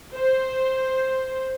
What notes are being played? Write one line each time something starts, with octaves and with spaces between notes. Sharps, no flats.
C5